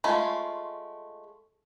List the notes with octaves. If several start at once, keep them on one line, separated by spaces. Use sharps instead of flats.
G#3 A3 C#4 F4 B5